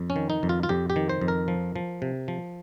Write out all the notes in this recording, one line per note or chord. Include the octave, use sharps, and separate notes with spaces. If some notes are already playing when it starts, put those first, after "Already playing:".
Already playing: F2
C#4
D#3
D#4
F2
F4
F4
F2 G4
G4
D#3
C5
F2
A#4
F3
F3
C3
F3